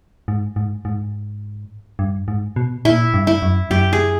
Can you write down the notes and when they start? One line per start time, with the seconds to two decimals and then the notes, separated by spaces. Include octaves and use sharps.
0.28 G#2
0.56 G#2
0.85 G#2
1.99 G2
2.28 G#2
2.56 B2
2.85 A#2 E4
3.14 G2
3.27 E4
3.42 F#2
3.71 F#2 G4
3.93 G#4